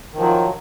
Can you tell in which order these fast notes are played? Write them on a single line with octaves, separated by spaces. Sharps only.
D#3 F3 F#3